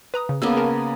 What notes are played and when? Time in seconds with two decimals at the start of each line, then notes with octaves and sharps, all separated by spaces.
0.14 B4 A#5 D#6
0.29 C#3
0.42 C#3 A#3 B3 D6 E6
0.57 G#4 A#4 A5